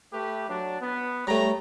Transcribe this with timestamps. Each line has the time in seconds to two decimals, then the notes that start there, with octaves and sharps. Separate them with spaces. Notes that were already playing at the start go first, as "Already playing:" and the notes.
0.13 A3 G4 B4
0.49 F#3 D4
0.81 B3
1.27 G3 A3 C#5 A#5